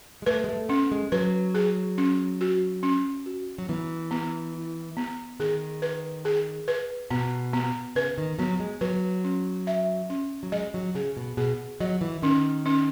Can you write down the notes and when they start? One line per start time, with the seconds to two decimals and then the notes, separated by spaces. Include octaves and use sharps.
0.22 G#3
0.26 A3 B4
0.44 G#3
0.49 A3
0.69 B3 C#4
0.92 G#3
1.12 F#3 B4
1.55 G#4
1.98 C#4
2.41 F#4
2.83 C#4
3.26 F#4
3.58 F#3
3.69 E3 B3
4.11 B3
4.54 E4
4.97 B3
5.40 D#3 G#4
5.82 B4
6.25 G#4
6.68 B4
7.11 B2 B3
7.53 B3
7.95 C#3 B4
8.18 D#3
8.39 F#3 B3
8.60 G#3
8.81 F#3 B4
9.24 C#4
9.67 E5
10.10 C#4
10.43 F#3
10.52 G#3 D#5
10.74 F#3
10.95 C#3 G#4
11.17 B2
11.37 B2 G#4
11.80 F#3 D#5
12.01 E3
12.23 D#3 C#4
12.65 C#4